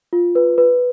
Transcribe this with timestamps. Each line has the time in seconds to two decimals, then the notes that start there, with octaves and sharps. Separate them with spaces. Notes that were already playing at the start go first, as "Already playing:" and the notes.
0.13 F4
0.35 B4
0.58 B4